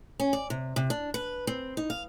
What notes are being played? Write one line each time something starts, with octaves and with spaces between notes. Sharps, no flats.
C#4
D5
C3
C3
D4
B4
C4
D#4
F5